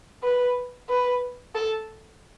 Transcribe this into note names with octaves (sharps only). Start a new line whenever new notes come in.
B4
B4
A4